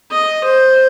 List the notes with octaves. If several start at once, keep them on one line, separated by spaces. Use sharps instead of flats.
D#5
C5